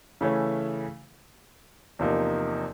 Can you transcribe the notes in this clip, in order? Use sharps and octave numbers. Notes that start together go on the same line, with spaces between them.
C#3 E3 A3 C#4
E2 C3 F3 A#3 D#4